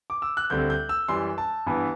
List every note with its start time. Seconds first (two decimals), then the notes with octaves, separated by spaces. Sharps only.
0.10 D6
0.22 E6
0.37 F#6
0.50 D2 D3 G3 C4 G6
0.70 G6
0.89 E6
1.08 F#2 E3 G3 C6
1.38 A5
1.66 G2 E3 B3